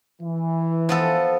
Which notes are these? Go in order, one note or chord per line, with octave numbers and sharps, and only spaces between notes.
E3
F3 B3 A4